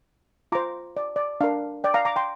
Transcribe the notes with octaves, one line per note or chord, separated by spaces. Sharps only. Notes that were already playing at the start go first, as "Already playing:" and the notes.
F4 C5 A#5 D6
D5
D5
D4 A#4 F5
D5 G5
F5 A#5
A#5 D6
G5 C6